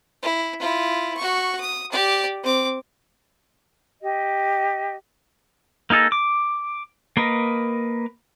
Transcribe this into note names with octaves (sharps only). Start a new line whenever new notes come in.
E4
E4 F4
F#4 C#6
D#6
G4 D5
C4 D6
G4 D#5
A#3 D#4 G#4 A4 D#5
D6
A#3 A#4 B4 D#5